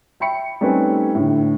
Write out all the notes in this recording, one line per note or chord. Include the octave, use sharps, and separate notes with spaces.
E5 G5 B5 C#7
G3 A3 C4 C#4 D#4 B4
A2 D3